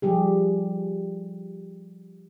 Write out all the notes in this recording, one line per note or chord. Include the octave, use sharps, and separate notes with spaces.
F3 G3 G4 G#4